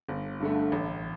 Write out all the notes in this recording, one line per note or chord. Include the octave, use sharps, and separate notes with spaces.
G1
G2 D3 A3
A1